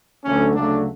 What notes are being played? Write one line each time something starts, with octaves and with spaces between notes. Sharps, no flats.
D2 D3 F#3 A3 C#4
D2 C#3 F#3 A3 D4